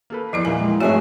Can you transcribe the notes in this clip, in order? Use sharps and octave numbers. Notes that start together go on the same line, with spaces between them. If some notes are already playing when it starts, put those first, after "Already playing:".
A#3 A4 B4
E2 F3 E4 D5
A#2 E3 G3 A#3 G#5
G#3
G#2 C3 F#3 A3 C4 F#4 G#4 E5